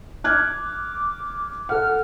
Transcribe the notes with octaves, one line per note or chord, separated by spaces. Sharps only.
D6 F6 F#6 G#6
A4 F#5 F6